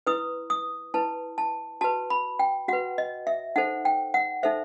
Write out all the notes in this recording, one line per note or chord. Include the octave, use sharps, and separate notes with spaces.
E4 B4 D#6
D#6
E4 B4 A5
A5
F#4 B4 A5
B5
G5
F#4 B4 F#5
D#5
E5
D#4 A4 C5 F#5
G5
F#5
D#4 A4 C5 E5